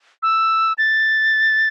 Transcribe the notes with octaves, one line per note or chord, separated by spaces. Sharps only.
E6
A6